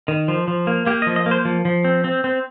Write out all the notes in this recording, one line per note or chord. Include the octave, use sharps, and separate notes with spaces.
D#3
F3
F3
A#3
A#3 G4
D#5
F3
D#5
A#3
C5
F3
F3
C4
C4
C4